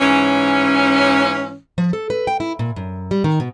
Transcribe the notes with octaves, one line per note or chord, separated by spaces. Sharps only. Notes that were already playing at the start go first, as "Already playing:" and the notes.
G#2 E3 C#4
F3
A4
B4
G5
E4
A#2
F#2
G3
D#3
B2